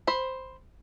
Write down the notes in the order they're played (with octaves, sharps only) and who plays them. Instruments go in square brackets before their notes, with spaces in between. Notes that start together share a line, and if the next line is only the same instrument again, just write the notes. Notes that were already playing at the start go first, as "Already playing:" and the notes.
[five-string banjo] C5 B5